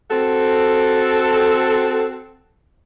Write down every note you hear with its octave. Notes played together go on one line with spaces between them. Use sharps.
C4 F#4 A4